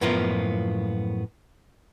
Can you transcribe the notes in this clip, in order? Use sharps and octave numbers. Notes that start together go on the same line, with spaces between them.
F#2 A2 F3 A#3 B3 F4